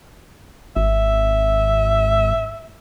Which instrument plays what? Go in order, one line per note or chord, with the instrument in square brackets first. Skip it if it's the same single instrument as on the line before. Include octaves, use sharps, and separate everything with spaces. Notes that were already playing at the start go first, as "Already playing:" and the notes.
[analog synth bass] G#1 [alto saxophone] E5